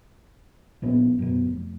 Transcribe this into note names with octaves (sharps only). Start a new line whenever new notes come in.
A#1 A#2 B3 C#4
F#2 B2
F1